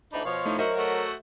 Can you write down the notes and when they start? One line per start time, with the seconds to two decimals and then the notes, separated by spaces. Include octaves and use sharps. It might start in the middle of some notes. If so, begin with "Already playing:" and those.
0.13 D2 E3 D4 D#4 B5
0.25 B2 F3 C#5 F5
0.46 A3 D#4 E4
0.59 F#3 F#4 A#4 C5 D#5 E5
0.78 A3 F#4